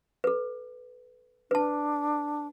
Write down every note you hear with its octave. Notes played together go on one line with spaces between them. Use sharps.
A4 B4
D4 B4 A5